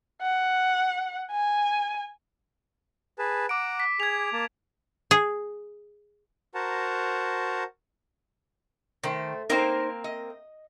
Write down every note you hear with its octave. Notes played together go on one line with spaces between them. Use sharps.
F#5
G#5
G#4 B4 A5
F#5 A#5 D6 D7
B6
G#4 G#6 F7
A#3 A5
G#4
F#4 A#4 C5 F#5 A5 A#5
D#3 A3 C5
A#3 C4 D#4 A#4 C5
D#5